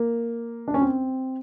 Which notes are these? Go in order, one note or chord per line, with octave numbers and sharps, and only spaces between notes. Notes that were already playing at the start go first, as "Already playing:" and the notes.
Already playing: A#3
D4
C#4
C4